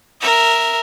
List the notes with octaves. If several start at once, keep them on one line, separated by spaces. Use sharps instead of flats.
A#4 E5